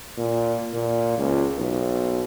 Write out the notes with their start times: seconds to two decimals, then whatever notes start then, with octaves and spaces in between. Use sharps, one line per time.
0.17 A#2
0.73 A#2
1.18 C#2
1.58 B1